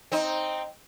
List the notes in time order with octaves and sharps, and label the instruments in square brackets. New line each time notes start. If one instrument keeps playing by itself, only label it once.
[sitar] C4 D#4